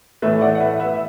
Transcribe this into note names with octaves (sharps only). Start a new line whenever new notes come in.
A2 E3 A3 B4 E5
D5 F#5
F#5
B4 E5
B4 E5
E5